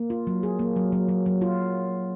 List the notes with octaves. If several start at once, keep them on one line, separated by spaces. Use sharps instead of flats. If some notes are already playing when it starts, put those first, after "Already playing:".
Already playing: A#3
F4
F#3
G#4
A#3
F#3
F#3
F#3
F#3
F4